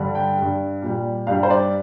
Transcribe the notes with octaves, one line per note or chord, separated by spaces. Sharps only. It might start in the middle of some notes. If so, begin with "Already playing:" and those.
Already playing: G2 D3 G3
G5
G2 G3
A#2 G3
G2 G3 F5
C5
D5